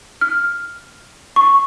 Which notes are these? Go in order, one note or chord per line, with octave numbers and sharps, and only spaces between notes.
F6
C#6